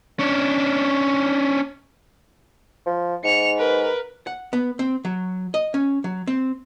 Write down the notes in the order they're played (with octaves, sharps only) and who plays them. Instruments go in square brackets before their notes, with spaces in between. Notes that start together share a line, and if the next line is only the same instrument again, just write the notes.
[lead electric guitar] C#4 D4
[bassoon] F3
[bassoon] G#2 [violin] C#7 F7
[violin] A#4 B4
[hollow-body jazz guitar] F#5
B3
C4
F#3
D#5
C#4
F#3
C4